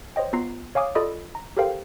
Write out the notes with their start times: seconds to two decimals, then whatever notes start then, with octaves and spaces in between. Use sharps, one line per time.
0.16 C5 C#5 D#5 G5
0.33 B3 F4 A#5 C7
0.75 C#5 F5 G#5 D6 D#6
0.95 F4 A4 D5 D#5 B5 D#6
1.35 A#5
1.57 G4 A4 A#4 C5 F5 G5